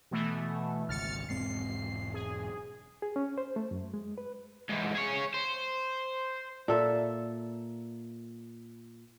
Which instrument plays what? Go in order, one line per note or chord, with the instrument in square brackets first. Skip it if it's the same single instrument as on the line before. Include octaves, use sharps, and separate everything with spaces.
[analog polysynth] B2 E3 A3
[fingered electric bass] G#1 C#2 [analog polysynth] F6 A6 C#7
[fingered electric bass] E1 G#2 C4 [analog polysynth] C7
[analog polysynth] G#4
[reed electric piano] G#4
C#4
C5
A3
F#2
G#3
B4
[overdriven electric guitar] G#2 E3
G#4 C#5
C5
[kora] A#2 A4 E5